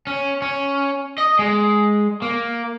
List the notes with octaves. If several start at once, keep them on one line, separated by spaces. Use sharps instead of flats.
C#4
C#4
D#5
G#3
A#3